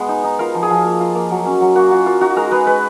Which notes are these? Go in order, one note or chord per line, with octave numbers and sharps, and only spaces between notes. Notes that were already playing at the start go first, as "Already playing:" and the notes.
Already playing: G#3 B3
D#4
D#4
F4 A#4
F3
G#4
F3
A#3
F4
A#3
F#3
C#4
F#3
A#3 F#4
F4 F#4
A#3 F4
D#4 F#4
G#3 A#4
G#3 B4
G#3 B4